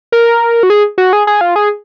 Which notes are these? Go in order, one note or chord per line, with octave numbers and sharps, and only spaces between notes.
A#4
F#4
G#4
F#4
G#4
G#4
F4
G#4